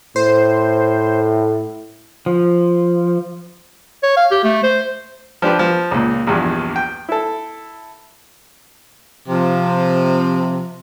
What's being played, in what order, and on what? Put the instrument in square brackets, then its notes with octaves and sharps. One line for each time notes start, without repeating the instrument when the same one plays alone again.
[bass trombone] A2 [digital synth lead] C5
[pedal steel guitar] F3
[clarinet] C#5
F5
G4
A3
C5
[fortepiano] F3 D4 G4 B4
F3
C#2 A#2
A#1 E2 G2
G5
E4 A4
[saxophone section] C3 F3